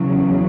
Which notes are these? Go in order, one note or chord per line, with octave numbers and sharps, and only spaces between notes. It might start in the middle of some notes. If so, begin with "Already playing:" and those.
Already playing: E2 C#3 F#3